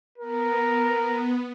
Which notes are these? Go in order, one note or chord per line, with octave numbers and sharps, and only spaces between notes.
B3 A#4